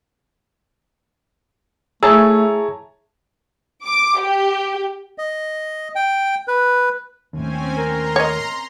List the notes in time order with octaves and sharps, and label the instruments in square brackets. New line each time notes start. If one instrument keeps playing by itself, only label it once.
[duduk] A3 [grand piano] E4 C#5 A#5 [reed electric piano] G#4 A5 [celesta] E6
[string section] D6
G4
[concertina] D#5
G5
B4
[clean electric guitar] D#2 A2 [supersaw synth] C4 C#4 G#5
[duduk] A#4 [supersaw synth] A#5 C6
[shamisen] C#5 D#5